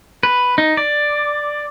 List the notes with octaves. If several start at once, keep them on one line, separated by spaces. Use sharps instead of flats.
B4
D#4
D5